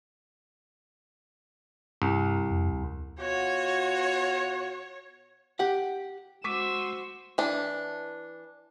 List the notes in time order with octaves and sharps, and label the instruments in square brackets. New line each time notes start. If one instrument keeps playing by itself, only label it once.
[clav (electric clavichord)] C2 [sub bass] G2
[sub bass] F2
D2
[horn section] B2 F4 F#4 [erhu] C#5
[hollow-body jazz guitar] G4 F#5
[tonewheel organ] G#3 [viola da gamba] F#4 C5 [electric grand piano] C#6 D6 B6 [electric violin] E6
[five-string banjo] E3 D4